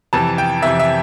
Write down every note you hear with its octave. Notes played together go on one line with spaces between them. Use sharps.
F2 C3 E3 A5
G5
F2 C3 E3 E5
E5